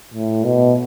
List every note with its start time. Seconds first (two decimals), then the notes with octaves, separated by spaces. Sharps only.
0.14 A2
0.44 B2